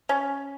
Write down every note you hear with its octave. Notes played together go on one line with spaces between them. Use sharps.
C#4